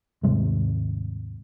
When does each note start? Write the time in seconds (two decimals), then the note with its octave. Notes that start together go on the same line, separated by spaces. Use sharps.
0.23 D#2 G#2 C3 G3